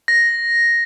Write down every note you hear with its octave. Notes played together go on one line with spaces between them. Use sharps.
A#6